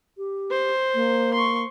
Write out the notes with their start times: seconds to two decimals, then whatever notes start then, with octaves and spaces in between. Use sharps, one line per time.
0.18 G4
0.50 C5
0.95 A#3
1.34 C6 C#6